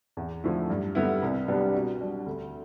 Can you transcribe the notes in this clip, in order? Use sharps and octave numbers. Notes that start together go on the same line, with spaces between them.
E2
D3 F3 A3 E4
G2
D3 G3 B3 E4
C2
C3 G3 B3 D4
B2
G3 D4
D2